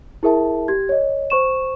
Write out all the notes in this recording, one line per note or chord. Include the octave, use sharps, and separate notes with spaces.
E4 G#4 A#4 E5 A5
G4 G#6
C#5 D#5
C5 C#6 E7